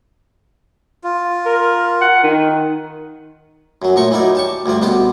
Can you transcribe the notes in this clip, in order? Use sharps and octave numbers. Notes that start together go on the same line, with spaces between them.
F4
A#4
F#5
D#3
F#2 F#3
A#2 F3 A3 A#4 C#6
E3 F#3 D#4 A#4 D5
G4 A5 C#6
D2 G2 F3 D5
C2 B2 B3 G4 C6 D6